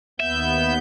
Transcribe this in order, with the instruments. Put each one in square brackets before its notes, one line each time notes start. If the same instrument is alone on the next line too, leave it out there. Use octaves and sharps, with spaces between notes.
[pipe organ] D#2 B3 G6 [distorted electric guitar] E5